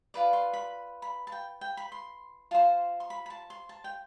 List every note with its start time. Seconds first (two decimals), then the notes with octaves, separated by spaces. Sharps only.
0.14 F4 B4 D5
0.33 C6
0.53 B5
1.02 B5
1.27 A5
1.32 G5
1.61 G5
1.77 B5
1.92 C6
2.51 F4 C5 A5
3.00 C6
3.10 B5
3.26 B5
3.30 A5
3.50 C6
3.69 A5
3.84 G5